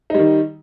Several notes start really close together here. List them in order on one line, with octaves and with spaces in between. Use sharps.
D#4 G3 D#3